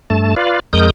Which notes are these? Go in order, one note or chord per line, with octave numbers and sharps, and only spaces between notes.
G2 A3 A5
F4 B4 D5 F5
F2 G#3 A#4 D#6 G6